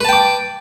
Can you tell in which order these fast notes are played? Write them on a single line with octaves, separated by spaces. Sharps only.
B4 A5 G5 D6